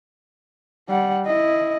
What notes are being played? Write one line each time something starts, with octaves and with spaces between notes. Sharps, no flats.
G3 F#5
E4 D#5